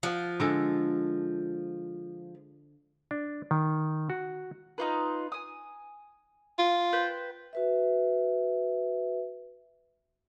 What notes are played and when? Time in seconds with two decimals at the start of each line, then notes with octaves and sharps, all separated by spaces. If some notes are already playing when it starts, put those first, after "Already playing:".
0.03 F3 F#5
0.40 D3 G#3 A4
3.11 D4
3.51 D#3
4.10 F#4
4.78 D#4 F4 B4
5.32 G#5 D#6
6.59 F4
6.93 B4 C5 G5
7.53 F#4 B4 E5